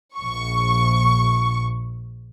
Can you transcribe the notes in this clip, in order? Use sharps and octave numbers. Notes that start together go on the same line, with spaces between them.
A#1 C#6